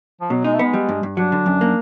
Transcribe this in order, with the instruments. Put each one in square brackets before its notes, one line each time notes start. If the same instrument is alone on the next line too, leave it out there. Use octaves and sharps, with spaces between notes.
[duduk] F3
[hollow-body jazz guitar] B2 [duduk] F#3
[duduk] G#3 [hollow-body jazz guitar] D#4
[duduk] A3
[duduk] G#3 [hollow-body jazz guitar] B3
[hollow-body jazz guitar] G3
G2
G2
[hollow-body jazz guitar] F#3 [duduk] D4
[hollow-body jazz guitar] D3
F#2
A#3